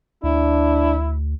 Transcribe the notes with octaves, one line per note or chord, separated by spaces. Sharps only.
D2 D4 E4